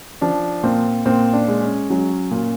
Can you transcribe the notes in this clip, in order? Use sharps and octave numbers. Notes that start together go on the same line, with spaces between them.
F3 D4
A#2 C4
A#2 C4
D4
G#3
C#4
F#3 C#4
A#2